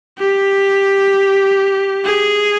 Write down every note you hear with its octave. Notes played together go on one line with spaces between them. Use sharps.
G4
G#4